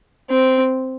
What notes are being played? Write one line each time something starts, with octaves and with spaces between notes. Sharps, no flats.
C4